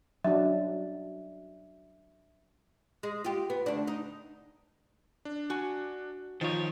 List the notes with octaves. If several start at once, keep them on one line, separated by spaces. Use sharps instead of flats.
F#3 D4 E5
G#3
F4 G4
B3
D2 D4
D#4
D4
F#4 G#5
D#3 F3 D#4 F4 C#5